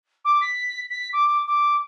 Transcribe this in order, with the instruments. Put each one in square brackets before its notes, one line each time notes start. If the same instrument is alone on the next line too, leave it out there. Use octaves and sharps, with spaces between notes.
[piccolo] D6
B6
B6
D6
D6